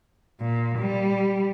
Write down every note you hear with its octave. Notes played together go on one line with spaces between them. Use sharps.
A#2
G3